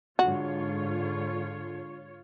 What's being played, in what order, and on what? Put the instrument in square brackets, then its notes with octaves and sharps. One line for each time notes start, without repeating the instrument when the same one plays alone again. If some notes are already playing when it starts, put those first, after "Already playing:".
[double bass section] G#2 D3 [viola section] F4 C#5 [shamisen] F#4